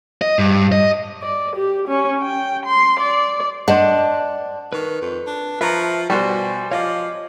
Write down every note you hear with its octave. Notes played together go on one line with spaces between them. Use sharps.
D#5
G2
D#5
D5
G4
C#4
G5
C6
D5
D4 C5 D#5 F#5
D#3 B4 C#6
F2
D4
F3 B4 E5 A#5 C#6
B2 G3 F#4 C5 G#5 C#6
F3 C#5 D#5 F5 D6